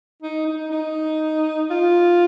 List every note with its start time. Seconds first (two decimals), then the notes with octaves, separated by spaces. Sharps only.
0.22 D#4
0.46 D#4
0.71 D#4
1.70 F4